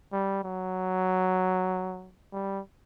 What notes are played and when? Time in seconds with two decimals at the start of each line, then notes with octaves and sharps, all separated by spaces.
0.13 G3
0.43 F#3
2.32 G3